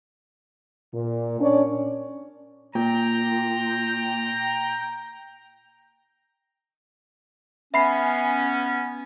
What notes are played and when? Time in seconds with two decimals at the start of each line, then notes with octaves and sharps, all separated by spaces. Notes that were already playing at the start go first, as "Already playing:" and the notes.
0.93 A#2
1.40 C#4 D4 C#5 D5
2.75 A#2 G5 A#5
7.74 B3 C#4 E5 B5 C7